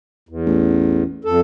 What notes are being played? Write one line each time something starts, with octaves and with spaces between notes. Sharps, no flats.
E2
A1
F2 A4